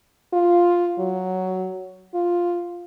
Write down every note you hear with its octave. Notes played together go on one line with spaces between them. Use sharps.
F4
F#3
F4